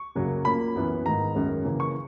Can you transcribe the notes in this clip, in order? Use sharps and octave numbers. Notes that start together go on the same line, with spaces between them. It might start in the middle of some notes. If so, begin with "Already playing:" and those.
Already playing: C#6
F#2 C#3 F#3 A#3
A#2 A#3 C#4 B5
F#2 E3 B3
G#2 D#3 G#3 A#5
F#2 D#3 G#3 C#4
C#3 E3 A#3 C#4
C#6